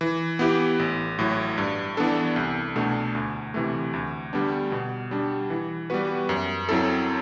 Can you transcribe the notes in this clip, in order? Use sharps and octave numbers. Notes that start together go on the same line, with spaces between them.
E3
B3 E4 G4
A1
A2 F#3
G2
E3 B3 D4 A4
C2
B2 A3 D4
D2
C3 E3 A3
D2
D3 G3 B3 D4
B2
G3 D4
E3
G3 B3 F#4 B4
F#2
F#3 C4 E4 A4